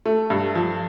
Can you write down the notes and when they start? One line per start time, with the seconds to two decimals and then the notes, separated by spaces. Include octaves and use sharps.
0.05 A3
0.30 G2
0.55 F3